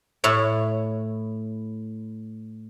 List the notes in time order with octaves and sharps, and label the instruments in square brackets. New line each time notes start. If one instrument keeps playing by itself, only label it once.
[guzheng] A2 E4 C#5